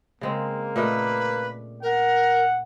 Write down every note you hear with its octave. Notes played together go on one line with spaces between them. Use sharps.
C#3 G#3 A#3 C4
A#2 A3 B4 D#5
A#4 F#5